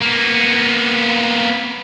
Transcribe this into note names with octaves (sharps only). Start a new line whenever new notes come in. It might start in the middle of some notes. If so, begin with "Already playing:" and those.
A#3 B3